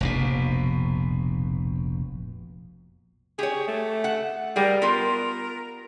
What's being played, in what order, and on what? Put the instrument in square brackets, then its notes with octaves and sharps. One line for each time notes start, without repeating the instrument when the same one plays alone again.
[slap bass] F1 A#1 B2
[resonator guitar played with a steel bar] G4 C#5 [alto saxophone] G#4
[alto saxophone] A3
[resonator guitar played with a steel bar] F#5
[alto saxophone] G3 [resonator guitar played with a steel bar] G#4 A#4
[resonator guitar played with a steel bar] B3 F4 [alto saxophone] A#4